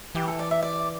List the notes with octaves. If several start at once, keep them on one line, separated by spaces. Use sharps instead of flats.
E3 G4
A4
D5
E5
D5